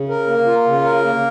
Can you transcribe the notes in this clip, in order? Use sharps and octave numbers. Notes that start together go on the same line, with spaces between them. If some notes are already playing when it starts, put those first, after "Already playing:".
Already playing: C#3
A#4
A#3
F4
C#3
A#4
A#3